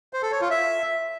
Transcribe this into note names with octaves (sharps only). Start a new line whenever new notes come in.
C5
A4
C#5
F4
E5